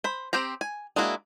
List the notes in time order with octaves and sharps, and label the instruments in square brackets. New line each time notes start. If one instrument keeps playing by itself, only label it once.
[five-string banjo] C5 B5
C4 G4 C5 A#5
G#5
G#3 A#3 D4 E4 F#4